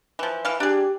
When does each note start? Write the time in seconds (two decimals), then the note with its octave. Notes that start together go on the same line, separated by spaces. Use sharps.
0.19 E3 F3
0.45 E3 F5
0.60 D4 G4 G#4